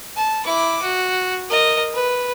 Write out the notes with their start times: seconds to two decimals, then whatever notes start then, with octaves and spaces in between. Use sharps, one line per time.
0.16 A5
0.45 E4 D6
0.82 F#4
1.50 A#4 D#5
1.93 B4